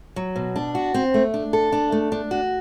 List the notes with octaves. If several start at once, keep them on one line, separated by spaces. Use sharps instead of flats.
F#3
B2
D4
F#4
C4
A3
D4
A4
D4
A3
D4
F#4